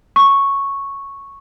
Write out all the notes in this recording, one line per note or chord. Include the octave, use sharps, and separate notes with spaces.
C#6